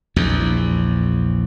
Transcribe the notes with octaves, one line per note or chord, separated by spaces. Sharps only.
A#1 E2